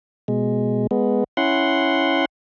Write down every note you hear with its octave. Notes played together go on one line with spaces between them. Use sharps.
B2 G#3
G#3 B3
C#4 E4 F#5 C6